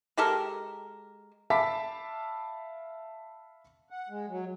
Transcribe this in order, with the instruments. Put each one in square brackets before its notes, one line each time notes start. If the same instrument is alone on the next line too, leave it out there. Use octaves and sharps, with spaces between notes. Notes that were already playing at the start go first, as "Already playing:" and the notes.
[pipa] G#3 G4 A4 A#4
[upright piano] E5 F5 A5 B5 D6 B6
[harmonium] F#5
G#3
F#3